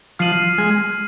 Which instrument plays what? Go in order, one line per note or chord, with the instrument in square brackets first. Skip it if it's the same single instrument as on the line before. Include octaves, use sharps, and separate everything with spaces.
[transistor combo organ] F3 [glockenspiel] F6 C7 D#7 F#7
[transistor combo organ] G#3